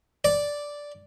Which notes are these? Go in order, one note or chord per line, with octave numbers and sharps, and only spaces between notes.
D5